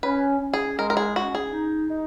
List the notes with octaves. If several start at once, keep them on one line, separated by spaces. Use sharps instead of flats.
C#4 B4
C#4
G#4
G#3 A#4
A#4
G#4
C#4 F#4
G#4
D#4
D#4